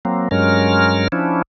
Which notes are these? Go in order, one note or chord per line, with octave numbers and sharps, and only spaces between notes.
F#3 A#3 C4
G2 F#3 G#3 C#4 A#4 F6
F3 C#4 D4 E4